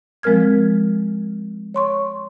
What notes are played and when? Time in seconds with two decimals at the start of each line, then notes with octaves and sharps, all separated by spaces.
0.23 F3 G#3 C4 A#4 F6 G#6
1.74 C#5 C6 C#6